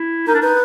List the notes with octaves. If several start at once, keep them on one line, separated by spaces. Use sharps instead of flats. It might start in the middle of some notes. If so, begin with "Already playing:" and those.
Already playing: E4
D#4 A#4
D4
D#4 B4